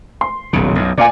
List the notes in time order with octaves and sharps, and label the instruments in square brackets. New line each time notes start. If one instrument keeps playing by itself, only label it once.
[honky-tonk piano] C6
[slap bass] D#1 B1 C#3
B1 F#2
[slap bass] A#2 [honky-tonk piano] D5 F5 G#5